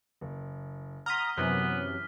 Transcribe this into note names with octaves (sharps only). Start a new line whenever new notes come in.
F#1
F#5 A#5 C6 D#6 F6 B6
F#2 C3 E3 F#3 B3 G#5